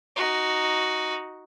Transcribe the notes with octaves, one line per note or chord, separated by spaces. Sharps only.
D#4 F#4